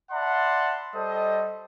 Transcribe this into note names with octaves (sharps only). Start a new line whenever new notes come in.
D5 E5 F#5 A5 B5 C6
G3 A4 C5 D#5